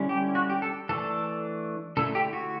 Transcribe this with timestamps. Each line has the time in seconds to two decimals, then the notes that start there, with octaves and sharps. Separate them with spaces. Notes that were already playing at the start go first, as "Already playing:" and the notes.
Already playing: D3 G3 C#4 E4
0.09 G4
0.35 F#4
0.50 G4
0.62 A4
0.89 E3 A3 D4 A4
1.97 D3 A3 E4 A4
2.15 G4
2.33 F#4